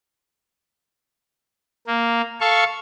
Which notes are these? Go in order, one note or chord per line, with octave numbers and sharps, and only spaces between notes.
A#3
A4 F5 C#6